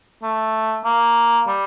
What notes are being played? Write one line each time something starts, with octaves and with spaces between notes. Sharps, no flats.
A3
A#3
G3